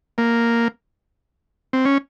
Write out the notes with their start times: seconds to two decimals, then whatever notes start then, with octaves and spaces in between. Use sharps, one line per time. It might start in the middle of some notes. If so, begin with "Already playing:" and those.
0.18 A#3
1.73 C4
1.85 C#4